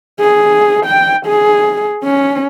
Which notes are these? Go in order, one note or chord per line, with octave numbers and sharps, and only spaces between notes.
G#4
G5
G#4
C#4